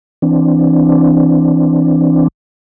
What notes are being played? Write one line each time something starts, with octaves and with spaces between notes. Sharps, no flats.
E3 C4 D4